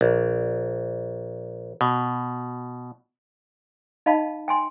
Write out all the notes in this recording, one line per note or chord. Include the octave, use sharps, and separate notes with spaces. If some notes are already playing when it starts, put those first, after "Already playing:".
A#1
B2
D#4 D#5 F5 A5 B5
G5 G#5 C6